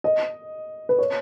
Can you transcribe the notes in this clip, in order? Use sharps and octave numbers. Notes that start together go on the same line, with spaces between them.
D#5
B4
C#5